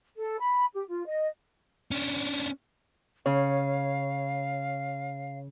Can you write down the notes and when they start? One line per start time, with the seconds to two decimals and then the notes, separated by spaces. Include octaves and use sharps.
0.17 A4
0.40 B5
0.73 G4
0.88 F4
1.07 D#5
1.91 C#4 D4
3.26 C#3 C#5 F5